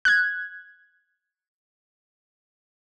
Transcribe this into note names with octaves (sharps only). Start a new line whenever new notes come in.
F#6 G#6